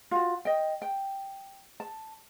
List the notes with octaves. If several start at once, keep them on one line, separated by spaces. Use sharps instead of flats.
F4 F#4
D#5 G5
G5
A5